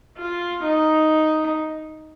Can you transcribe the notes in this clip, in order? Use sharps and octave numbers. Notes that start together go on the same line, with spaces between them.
F4
D#4